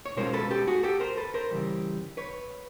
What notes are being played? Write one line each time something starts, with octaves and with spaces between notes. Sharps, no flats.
C#5
B2 G#3 C#4 F4 A#4 C5
A4 B4
G4 A4
F#4 G#4
G4 A4
A#4 C5
A4 B4
A#4 C5
C#3 E3 G3
B4 C#5